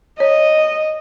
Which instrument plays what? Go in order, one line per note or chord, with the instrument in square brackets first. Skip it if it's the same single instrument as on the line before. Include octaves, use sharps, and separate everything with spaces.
[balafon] C#5 [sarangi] D#5